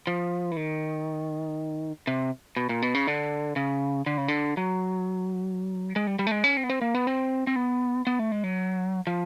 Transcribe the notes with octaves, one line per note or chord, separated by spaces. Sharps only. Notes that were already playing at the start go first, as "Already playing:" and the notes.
F3
E3
D#3
C3
B2
A#2
B2
C#3
D3
C#3
D3
C#3
D3
F#3
G#3
G3
G3
A3
G#3
C#4
C4
B3
C4
A#3
B3
C4
C4
B3
B3
A3
G#3
F#3
F3